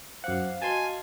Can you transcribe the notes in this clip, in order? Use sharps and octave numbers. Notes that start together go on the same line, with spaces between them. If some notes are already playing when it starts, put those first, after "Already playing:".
F#2 C5 F5 F#5 D6
F#4 B4 D#5 G#5 A5 C6